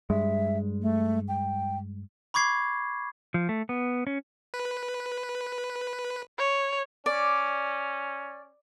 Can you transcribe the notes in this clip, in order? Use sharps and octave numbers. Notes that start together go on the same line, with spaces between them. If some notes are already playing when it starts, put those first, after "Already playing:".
G2 G#3 E5
A3
G5
B5 C#6 D6 G#6 C7
F3
A3
B3
C#4
B4
C#5
C#4 D5